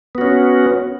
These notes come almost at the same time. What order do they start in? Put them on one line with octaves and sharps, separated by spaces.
B3 F#4 C#4